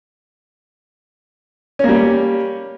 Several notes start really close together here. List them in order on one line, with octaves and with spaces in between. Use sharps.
C#4 A#3 G3